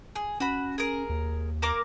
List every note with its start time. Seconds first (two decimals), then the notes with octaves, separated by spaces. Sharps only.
0.16 G#4
0.40 C#4 F#4 B5
0.78 G#4 A#4
1.10 D#2
1.62 A#3 A#4 D6